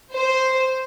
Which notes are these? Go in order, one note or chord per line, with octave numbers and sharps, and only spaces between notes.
C5